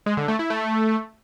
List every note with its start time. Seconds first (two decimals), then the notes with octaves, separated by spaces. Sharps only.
0.06 G#3
0.17 D3
0.28 A3
0.39 E4
0.50 A3